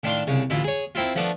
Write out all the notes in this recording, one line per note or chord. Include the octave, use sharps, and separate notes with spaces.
A2 D#3 D4 F5 C6
C2 C#3
A1 D2 E4 F4
G#4 C#5
A#3 C4 E4 F4
F3 A3 B3 D4